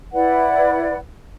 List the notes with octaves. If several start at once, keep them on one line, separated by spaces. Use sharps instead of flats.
E4 B4 D5 F#5